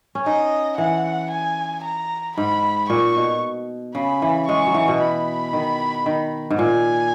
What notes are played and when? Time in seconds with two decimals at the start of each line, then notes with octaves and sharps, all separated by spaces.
0.15 C#4
0.26 D#4 D#5
0.78 E3 F#5
1.31 G#5
1.84 A#5
2.37 G#2 B5
2.90 A#2 C#6
3.16 B2
3.95 C#3 B5
4.22 E3
4.48 G#3 C#6
4.66 F#3
4.74 E3
4.88 B2
5.01 B5
5.53 D#3
6.06 D#3
6.50 G#2
6.59 A#2 G#5